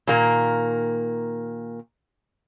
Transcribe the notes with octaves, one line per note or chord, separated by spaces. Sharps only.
A#2 D#3 A#3